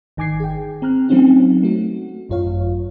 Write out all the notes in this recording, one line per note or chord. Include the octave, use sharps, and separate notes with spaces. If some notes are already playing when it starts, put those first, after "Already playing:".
G#1 D#3 G#5 D6 G#6 C7
G#4 G5
C4 A#5 F6 F#6
F#3 A3 C4 C#4 D#4 F#4
A3 F#4
G#1 F#2 F4 C#5 F5